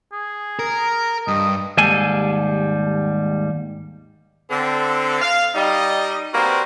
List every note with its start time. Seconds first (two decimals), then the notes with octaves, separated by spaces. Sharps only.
0.12 G#4
0.59 A#4
1.28 G2 D#5
1.78 D#2 G#2 G3 G#4 A4 G#5
4.51 D3 C4 A4
5.21 F5
5.55 G3 D#4 D#5
6.34 G3 A#3 C4 F#4 B4 C5